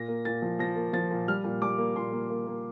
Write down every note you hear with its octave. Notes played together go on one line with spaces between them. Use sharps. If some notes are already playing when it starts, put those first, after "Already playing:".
Already playing: A#2 A#6
A#3
A#2 A6
F3
F3 A#6
A#3
F3 A6
A#2
G3 F6
A#2
G3 D6
A#3
A#2 C6
A#3
A#3
A#3